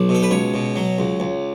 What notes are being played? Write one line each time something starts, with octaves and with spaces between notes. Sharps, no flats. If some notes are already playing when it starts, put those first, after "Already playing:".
Already playing: B1 D5
B2
A4
B4
C#2 C#5
B2
F#3
C#2
C#2